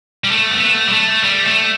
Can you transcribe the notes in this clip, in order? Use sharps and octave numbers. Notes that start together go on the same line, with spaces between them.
G3
A3
B3
A3
G3
A3
G3
A3